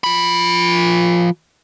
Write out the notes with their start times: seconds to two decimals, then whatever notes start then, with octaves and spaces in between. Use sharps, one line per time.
0.04 F3 B5